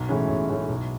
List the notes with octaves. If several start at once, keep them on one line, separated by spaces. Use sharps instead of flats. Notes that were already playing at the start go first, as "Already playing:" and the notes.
Already playing: B1
A2 E3 G#3 C#4
B1
A2 E3 G#3 C#4
B1